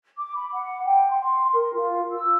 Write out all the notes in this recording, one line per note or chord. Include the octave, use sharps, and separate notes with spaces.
D6
B5
F#5
G5
C6
A#4
F4
E6